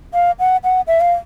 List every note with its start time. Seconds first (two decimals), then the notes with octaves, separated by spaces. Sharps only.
0.14 F5
0.40 F#5
0.64 F#5
0.87 E5
1.01 F5